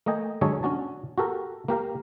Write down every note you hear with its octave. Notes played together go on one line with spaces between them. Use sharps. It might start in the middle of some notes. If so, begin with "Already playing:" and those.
A3 A#3 D#5 G5 G#5
D3 F#3 G#3 G#4 A4 C#5
C#4 D4 F#4 A5
F#4 G4 A4 A#4
A#3 G4 A#4 F5